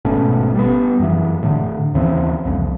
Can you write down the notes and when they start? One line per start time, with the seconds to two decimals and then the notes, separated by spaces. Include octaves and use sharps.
0.05 G#1 B2 A3 C#4
0.55 G3 B3
1.00 F#2 E3
1.43 A2 D3
1.94 D#2 C#3 E3 C4
2.45 C2 F2